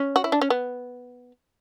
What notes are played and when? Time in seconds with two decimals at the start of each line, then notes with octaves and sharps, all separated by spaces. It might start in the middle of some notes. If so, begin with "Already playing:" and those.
Already playing: C#4
0.16 F#4
0.24 E4
0.32 D4
0.41 C#4
0.50 B3